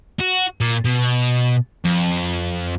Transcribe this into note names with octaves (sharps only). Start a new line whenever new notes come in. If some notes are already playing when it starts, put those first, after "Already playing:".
F#4
A#2
B2
F2